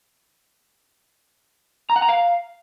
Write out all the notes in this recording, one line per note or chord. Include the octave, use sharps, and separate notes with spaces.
A#5
F#5
A#5
F5